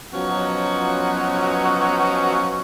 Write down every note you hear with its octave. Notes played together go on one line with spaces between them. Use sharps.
F3 F#3 B3 C#4 D#4 F#4